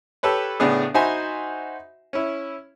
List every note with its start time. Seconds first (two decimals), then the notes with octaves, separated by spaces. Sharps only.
0.23 G4 A4 B4 C#5
0.60 A2 C#3 B3 D4 G#4
0.94 D#4 F#4 C5 E5 G#5 B5
2.13 C#4 E4